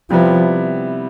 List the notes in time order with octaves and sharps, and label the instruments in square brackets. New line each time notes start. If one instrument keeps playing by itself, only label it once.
[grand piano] C3 G3 B3 E4 [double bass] F3